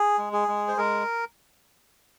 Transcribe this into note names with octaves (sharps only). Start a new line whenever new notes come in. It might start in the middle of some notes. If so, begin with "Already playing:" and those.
Already playing: G#4
G#3
G#4
G#3
C5
G#3 A#4